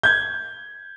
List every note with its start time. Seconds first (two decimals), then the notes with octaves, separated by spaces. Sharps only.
0.03 G6 G#6